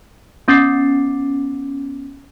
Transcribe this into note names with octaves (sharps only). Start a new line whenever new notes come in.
B3 C#4 D6 A6 C7